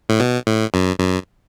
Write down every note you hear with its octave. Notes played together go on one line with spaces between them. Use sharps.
A2
B2
A2
F#2
F#2